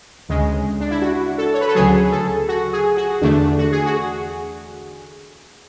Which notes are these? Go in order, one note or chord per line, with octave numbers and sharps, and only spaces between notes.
D2 C#3 G#3
D4
E4
F#4
A4
C#5
B4
A4
D2 C#3 F#3 G#4
A4
F#4
G#4
F#4
E2 D3 A3 D4
F#4
G#4
F#4